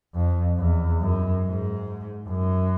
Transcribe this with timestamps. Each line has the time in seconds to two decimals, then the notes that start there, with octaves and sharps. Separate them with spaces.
0.15 F2
0.58 E2
1.00 F#2
1.44 G#2
2.29 F#2